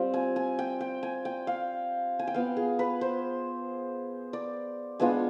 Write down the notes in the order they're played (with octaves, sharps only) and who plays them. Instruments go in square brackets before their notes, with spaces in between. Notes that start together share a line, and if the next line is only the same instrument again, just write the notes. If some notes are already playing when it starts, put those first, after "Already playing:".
Already playing: [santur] G3 C4 F4
G#5
G#5
G5
G5
G#5
G5
F5
G#5
G5
B3 F4 F5
G#4
B4
C5
D5
G#3 B3 D4 F4 G#5